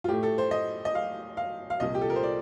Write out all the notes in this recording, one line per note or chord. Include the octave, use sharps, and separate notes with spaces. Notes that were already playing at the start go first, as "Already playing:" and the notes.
F4
A2 A3 G4
A4
C5
D#5
D#5
F5
F5
F5
C2 A#2 F3 D#5
G4
A4
A#4
C5
D5